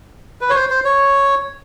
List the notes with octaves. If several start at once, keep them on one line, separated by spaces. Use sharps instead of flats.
B4
C#5
C5
C5
C#5